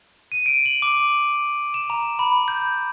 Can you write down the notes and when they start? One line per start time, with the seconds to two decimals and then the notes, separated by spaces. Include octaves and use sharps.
0.32 D#7
0.46 D7
0.66 F#7
0.82 D6
1.74 E7
1.90 A#5
2.19 B5
2.48 G6